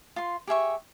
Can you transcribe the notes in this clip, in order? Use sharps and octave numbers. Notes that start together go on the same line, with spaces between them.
F4 C6
G4 G#4 E5 C#6